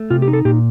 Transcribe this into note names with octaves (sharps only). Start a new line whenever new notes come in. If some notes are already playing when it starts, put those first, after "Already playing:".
Already playing: A3
C3 F4
G4
D#4
A4
A#2 G4